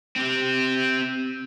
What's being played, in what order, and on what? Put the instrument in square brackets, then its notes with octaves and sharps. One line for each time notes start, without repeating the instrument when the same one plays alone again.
[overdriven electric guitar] C4 G4